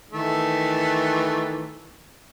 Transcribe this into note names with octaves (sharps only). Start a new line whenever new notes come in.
D#3 E3 A3